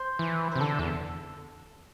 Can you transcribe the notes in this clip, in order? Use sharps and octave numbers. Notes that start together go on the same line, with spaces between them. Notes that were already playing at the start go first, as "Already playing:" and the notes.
Already playing: C5
E3
C5
C3
D3 A4
E2